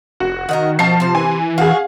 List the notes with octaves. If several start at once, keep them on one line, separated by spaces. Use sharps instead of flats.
F1 F#4
D#3 A#4 D#5 F#5
B2 F3 A#4 G5 A5 C7
C3 C5
E3 G#5
F#4 G#4 F5